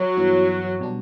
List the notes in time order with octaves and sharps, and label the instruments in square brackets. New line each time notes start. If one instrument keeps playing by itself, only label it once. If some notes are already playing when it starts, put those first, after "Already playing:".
Already playing: [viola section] F#3
[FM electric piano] G2 E3 B3 E4
B2 G3 B3 D4